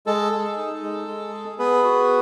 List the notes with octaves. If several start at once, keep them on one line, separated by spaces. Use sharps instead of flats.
G#3 A4
G#4
D#4
G#3
G#3
G#4
B3 G#4 B4
F#4